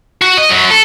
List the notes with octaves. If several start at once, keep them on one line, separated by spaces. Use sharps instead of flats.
F#4
D#5
F#2 F#3
A4